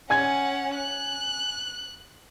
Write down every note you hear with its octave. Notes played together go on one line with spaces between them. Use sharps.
C#4 F#5 G#5 G#6
F#6